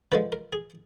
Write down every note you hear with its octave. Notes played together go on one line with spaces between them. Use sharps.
D3 F3 G#3 B4
A#4
G#4